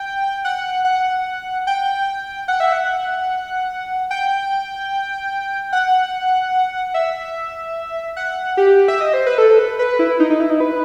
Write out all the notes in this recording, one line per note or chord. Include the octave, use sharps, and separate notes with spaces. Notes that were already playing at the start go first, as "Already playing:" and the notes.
Already playing: G5
F#5
F#5
G5
F#5
E5
F#5
G5
F#5
E5
F#5
G4
E5
D#5
C5
B4
A4
B4
B4
E4
D#4
D#4
E4
D#4
B4